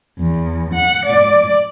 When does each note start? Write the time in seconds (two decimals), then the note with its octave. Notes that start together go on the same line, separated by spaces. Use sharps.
0.19 E2
0.74 F#5
1.06 D5